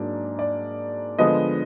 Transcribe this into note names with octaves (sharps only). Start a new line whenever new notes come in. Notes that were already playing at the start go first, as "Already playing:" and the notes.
Already playing: G#2 F#3 A#3 D4 D5
D5
D3 F3 G#3 B3 D#5